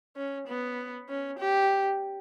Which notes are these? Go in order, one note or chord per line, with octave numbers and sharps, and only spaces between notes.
C#4
B3
C#4
G4